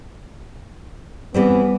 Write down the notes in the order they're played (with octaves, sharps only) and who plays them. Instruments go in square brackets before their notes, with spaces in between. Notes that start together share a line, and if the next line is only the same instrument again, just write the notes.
[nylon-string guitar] E3 G3 C4 [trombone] B3